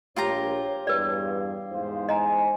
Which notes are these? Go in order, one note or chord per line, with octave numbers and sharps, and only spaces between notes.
A#1 F4 G4 C#5 A#5
E2 G2 B4 D5
F5
E2 G#2 C5
D#5 G#5 A#5